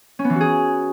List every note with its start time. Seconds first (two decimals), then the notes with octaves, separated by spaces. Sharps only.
0.19 C#4
0.24 B3
0.30 E3
0.35 F#4
0.41 G#4